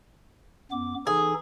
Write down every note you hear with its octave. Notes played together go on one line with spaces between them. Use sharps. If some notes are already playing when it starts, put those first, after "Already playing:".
F#2 B3 D6
E3 D#4 G#4 A4